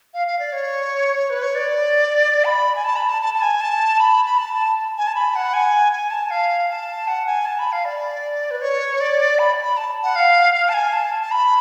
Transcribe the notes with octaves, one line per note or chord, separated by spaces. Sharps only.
F5
F5
D5
C#5
B4
C#5
D5
B5
G#5
A5
B5
A5
A5
A5
G#5
A5
B5
B5
A5
G#5
A5
B5
F#5
G#5
G#5
A5
F5
A5
F#5
G#5
A5
B5
F5
D5
B4
C#5
D5
B5
B5
A5
F#5
F5
F5
A5
G#5
A5
A5
B5